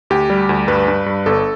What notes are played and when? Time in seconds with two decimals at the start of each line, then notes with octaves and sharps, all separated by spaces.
0.10 D2 G4
0.30 G3
0.49 D2
0.68 G2 B4
0.88 G2
1.06 G2
1.26 G1 A4